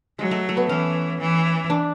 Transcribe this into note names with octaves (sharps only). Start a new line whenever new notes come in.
F#3 G#3
A3
A3
B3
E3 C#4
E3
D4